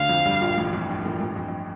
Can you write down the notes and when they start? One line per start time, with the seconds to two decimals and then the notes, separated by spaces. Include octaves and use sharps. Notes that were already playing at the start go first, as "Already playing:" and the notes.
Already playing: D2 D3 F5
0.09 F2 F3
0.25 G2 G3
0.41 A#1 A#2
0.58 A1 A2
0.73 F2
0.89 G2
1.04 A1 A2
1.20 A1 A2
1.29 G2
1.36 F2
1.48 F2